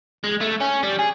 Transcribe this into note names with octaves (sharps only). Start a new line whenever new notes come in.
G#3
A3
C#4
G3
G#4